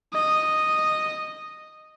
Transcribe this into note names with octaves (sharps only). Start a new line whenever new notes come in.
D#5